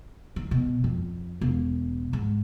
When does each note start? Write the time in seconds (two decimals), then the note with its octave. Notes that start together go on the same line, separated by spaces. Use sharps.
0.36 D#3
0.51 B2
0.84 F2
1.41 E1
2.13 G#2